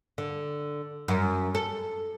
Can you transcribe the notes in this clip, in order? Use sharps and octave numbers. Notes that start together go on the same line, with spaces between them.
D3
F#2
A4